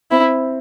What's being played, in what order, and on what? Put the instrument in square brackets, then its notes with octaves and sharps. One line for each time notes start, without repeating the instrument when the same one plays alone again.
[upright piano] C4 [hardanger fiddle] E4